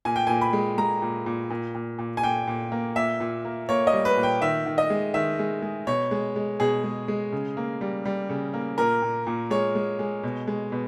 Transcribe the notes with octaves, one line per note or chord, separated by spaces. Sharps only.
A#2 G#5
G5
A#2 G#5
B5
G#3
G#3 A#5
A#2
A#2
A#2
A#2
A#2
G#5
A#2 G5
A#2
A#3
A#2 E5
A#2
A#3
A#3 C#5
D#5
G3
B4
A#2
G5
D#3 E5
D#3
D#5
G#3
D#3 E5
G#3
G#3
B2 C#5
G#3
G#3
B2 G#4
G#3
G#3
C#3
A#3
G3
G3
C#3
A#3
A#2 A#4
A#2
A#2
G#3 C#5
G#3
G#3
B2
G#3
B2